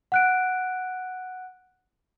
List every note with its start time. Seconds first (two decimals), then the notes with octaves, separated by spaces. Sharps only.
0.12 F#5 F#6 D7